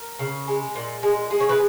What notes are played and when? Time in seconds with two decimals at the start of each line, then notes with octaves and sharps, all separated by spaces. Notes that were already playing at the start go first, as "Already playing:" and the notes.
Already playing: A#4
0.19 C#3
0.47 G#3
0.75 A#2
1.03 G#3
1.30 G#3 G#4
1.40 C#5
1.49 B4